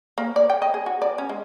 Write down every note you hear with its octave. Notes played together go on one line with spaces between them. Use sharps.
A#3
D5
G5
D#5
G#4
F#4
D5
C#4
G#3